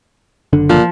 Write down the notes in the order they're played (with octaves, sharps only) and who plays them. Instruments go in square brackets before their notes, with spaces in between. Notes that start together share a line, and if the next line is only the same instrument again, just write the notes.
[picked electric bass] F#1 D3 D4
[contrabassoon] A#2 [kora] F3